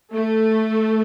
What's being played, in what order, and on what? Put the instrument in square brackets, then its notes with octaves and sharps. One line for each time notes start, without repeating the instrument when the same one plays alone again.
[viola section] A3